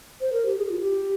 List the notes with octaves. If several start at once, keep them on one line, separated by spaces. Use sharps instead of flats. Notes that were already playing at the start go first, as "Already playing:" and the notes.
C5
A#4
G4
G#4
G4
F4
G4